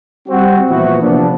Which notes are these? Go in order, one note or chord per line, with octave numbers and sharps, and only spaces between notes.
G3 C4 F#4
A#2 E3 F3 B3 E4 F#4
C3 F3 A#3 B3 D4